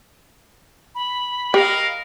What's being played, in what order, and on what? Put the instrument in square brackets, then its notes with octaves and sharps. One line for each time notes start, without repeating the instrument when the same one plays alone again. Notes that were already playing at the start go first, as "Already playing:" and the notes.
[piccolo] B5
[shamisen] G4 G5 [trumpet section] A#4 D#5 F5